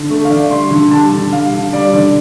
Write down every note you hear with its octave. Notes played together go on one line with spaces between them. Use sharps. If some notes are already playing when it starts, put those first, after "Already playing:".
Already playing: D3
A3
F5
D3 D5
G3 C6
D3
G3 A5
D3
G3 F5
D3
G3 D5
D3